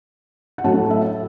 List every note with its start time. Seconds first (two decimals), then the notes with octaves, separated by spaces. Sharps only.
0.58 F#5
0.64 A2 F#3 A3 A5
0.90 E5